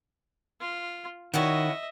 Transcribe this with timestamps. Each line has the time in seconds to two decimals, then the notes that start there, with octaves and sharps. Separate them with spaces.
0.61 F4
1.34 D#3 C#4 E4 F#4 D#5 E5